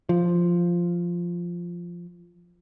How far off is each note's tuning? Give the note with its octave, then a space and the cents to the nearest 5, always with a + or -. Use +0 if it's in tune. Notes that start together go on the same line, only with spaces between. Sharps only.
F3 -5